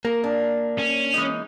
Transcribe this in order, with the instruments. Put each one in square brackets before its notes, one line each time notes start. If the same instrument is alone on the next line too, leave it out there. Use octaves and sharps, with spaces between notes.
[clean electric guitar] A#3 [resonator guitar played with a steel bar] A#4
[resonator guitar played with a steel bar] D4
[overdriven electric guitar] C#4
[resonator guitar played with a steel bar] E3 G#3 D#4